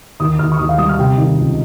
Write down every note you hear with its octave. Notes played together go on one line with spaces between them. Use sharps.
D#2 D#6
D#2 F6
C#6
D#2 D#6
F5
G3 D#6
F6
C3 G5
D#3
C#2